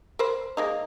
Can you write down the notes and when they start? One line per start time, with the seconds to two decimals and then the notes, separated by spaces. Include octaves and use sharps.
0.19 A#4 C5 B5
0.57 G#3 A#3 D#4